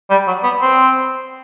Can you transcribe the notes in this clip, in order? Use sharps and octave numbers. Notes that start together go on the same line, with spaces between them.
G3
F#3
B3
C4